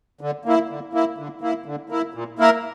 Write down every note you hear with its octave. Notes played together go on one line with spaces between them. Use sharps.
D3
A#3 E4
D3
A#3 E4
D3
A#3 E4
D3
A#3 E4
A#2
A#3 E4 A#4